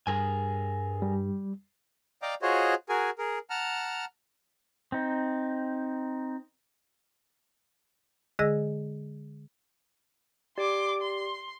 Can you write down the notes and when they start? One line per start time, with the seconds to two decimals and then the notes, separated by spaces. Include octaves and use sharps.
0.07 G2 G#4 A#4 G#5
1.02 G3
2.22 D5 D#5 F5 G5 A#5 D6
2.42 F4 F#4 G#4 C5 C#5 D#5
2.89 F#4 G#4 A#4 G#5
3.18 G#4 A#4
3.50 F#5 A5 A#5 F6
4.92 C4 D#4
8.39 D3 G#3 G#4 D#5 E6 A#6
10.58 G4 D5 C6 D6
11.01 C6